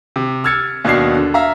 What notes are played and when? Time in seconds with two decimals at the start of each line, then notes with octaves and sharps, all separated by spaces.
0.16 C3
0.44 E6 F6 G#6 A6 C#7
0.85 D#2 B2 D4 G#6 C7
1.17 D3
1.34 E5 F5 A#5